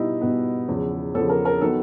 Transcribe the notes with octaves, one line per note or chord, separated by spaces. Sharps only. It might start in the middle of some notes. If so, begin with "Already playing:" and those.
Already playing: B2 G3 B3 D#4 E4
B2 G3 B3
E2 C#3 F3
E2 C#3 F3 A4
A#4
A#4
D#3 F#3 B3 A4